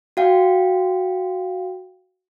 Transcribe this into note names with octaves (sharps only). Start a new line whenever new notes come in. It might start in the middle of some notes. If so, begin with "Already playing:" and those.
F#4 F5 G5